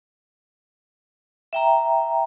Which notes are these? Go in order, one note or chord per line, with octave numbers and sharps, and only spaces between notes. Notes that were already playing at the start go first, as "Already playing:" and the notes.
E5 G5 A#5